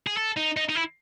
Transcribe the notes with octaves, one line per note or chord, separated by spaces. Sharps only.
G#4
A4
D#4
D#4
D#4
E4